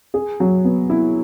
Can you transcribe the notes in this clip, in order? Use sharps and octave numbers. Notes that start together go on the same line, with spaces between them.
G#4
F#3
B3
E4